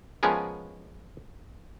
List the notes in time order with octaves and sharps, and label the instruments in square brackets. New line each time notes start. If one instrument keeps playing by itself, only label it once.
[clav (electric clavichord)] F3 G#3 B3 C#4 G#4 A#4